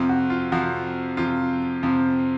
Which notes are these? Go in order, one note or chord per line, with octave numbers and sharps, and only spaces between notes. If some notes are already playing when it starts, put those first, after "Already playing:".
Already playing: F2 C3 F3
F#4
F4
F2 C3 F3 F#4
F2 C3 F3 F4
F2 C3 F3